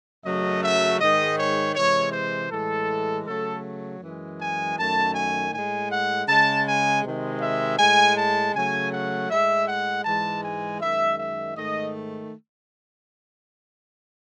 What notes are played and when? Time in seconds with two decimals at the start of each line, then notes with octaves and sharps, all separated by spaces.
0.24 F#2 C#3 F#3 A3 D#5
0.63 E5
1.00 G#2 D#3 G#3 D#5
1.38 C#5
1.75 C3 E3 G#3 C#5
2.12 C5
2.50 A2 E3 G#3 A4
3.26 C#3 F#3 A3 A4
4.01 F#2 E3 G#3
4.39 G#5
4.77 F#2 D#3 A3 A5
5.15 G#5
5.52 A2 G#5
5.57 G#3
5.90 F#5
6.27 C#3 G#3 A5
6.66 G#5
7.04 C3 D#3 G#3
7.40 E5
7.78 A2 G#3 G#5
8.16 A5
8.54 C#3 F#3 A3 G#5
8.92 F#5
9.30 A2 G#3 E5
9.67 F#5
10.05 G#2 E3 G#3 A5
10.43 G#5
10.80 F#2 D#3 G#3 E5
11.18 E5
11.56 G#2 D#3 A3 D#5